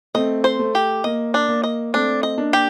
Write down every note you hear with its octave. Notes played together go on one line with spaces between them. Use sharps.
A3 C4 D#5
C5
A3
G4
A#3 D#5
D4
A#3
D#5
A3 C4 D4
D#5
A#3 D4
G4